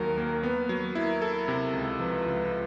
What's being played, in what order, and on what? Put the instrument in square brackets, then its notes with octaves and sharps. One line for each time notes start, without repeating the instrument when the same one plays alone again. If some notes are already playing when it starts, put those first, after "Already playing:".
Already playing: [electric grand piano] D#2 D#3 F#3 [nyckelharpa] A#4
[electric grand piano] A#3
[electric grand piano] B3 [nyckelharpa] B4
[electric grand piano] F#3
[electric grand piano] E4 [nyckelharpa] A#4
[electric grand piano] A4
C3
C#2
[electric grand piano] F3 [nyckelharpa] B4
[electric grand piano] C#2